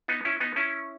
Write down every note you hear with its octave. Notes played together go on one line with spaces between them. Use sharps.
B3 D#4
C#4 E4
B3 D#4
C#4 E4